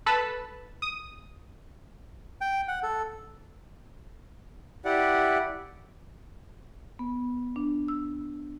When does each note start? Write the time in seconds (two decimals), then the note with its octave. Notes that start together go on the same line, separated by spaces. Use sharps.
0.06 A4 B4 A5 B5
0.82 D#6
2.41 G5
2.68 F#5
2.83 A4
4.85 E4 G4 D5 F#5
6.99 B3
7.56 D4
7.88 E6